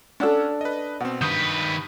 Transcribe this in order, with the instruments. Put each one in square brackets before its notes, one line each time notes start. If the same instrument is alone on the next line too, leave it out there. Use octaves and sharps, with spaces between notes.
[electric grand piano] C#4 F#5 E6 [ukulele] D4 A4
[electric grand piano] B4 D#5
[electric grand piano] B2 C4 [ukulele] F#5
[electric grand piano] G2 D#6 G6 [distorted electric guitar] D#3 B4